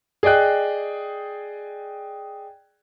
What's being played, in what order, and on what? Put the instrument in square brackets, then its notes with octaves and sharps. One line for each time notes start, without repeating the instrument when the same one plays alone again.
[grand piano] G#4 D5 D#5 G5 F#6